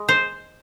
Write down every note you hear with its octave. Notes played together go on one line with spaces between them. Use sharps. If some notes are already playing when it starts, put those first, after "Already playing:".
Already playing: G#3
C5